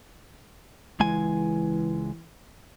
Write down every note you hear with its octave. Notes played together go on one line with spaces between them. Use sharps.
C#2 E3 G#3 G#5